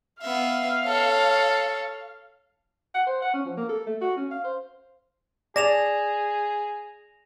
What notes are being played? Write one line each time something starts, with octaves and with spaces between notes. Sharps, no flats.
B3 E5 F5
A4 C#5
F#5
C5
F#5
C#4
F3
A#3
A4
A3
F#4
C#4
F5
C5
G#4 D5 A#6 E7 F7